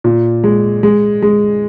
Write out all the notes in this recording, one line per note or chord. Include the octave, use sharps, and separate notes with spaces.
A#2
G#3
G#3
G#3